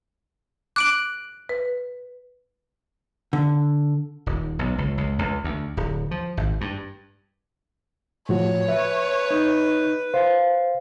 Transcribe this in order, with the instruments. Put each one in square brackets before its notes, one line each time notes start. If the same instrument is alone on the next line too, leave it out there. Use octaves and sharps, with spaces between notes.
[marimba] D6 [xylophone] F#6 D7 F#7
[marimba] B4
[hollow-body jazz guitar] D3
[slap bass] D#1
B1
C#2
C#2
C#2
D2
D1
F3
G#1
G2
[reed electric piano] A2 F3 F#4 [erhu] C#5
[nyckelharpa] B4 [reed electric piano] E5
[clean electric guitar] D#4
[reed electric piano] C5 [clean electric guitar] F5